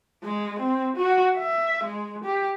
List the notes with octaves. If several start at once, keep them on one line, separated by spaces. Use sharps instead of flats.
G#3
C4
F#4
E5
G#3
G4